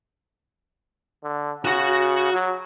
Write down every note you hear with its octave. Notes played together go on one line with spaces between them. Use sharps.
D3
C#3 F#4 F#5
F#3